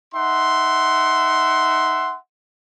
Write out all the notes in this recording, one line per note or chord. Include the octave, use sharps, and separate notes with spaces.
D#4 E5 F#5 C6